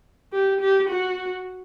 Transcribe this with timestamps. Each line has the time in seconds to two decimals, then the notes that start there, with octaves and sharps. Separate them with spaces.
0.33 G4
0.61 G4
0.89 F#4